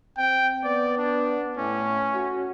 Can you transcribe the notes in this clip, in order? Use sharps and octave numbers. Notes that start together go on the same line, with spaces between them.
C4 G5
B3 D5
D4
A2 C#4
F#4